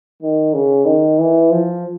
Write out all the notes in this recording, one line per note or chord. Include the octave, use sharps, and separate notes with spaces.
D#3
C#3
D#3
E3
F3